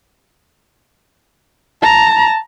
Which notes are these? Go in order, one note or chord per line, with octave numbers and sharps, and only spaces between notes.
A5 A#5